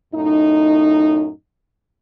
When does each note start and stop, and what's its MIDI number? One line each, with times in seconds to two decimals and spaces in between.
0.13 1.29 42
0.13 1.29 45
0.13 1.29 63